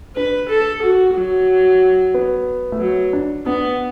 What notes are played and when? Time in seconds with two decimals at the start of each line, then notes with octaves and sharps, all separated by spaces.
0.16 D4 B4
0.49 A4
0.83 F#4
1.15 F#3
2.14 B3
2.72 A3
2.80 F#3 B3
3.13 D4
3.46 B3 D4